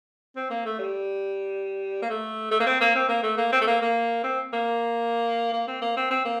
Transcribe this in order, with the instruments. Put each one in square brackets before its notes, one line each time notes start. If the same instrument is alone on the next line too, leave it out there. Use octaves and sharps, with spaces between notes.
[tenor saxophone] C4
A#3
A3
G3
A#3
A3
A3
A#3
C4
A#3
C4
A#3
A3
A#3
C4
A3
A#3
A#3
C4
A#3
A#3
C4
A#3
C4
C4
A#3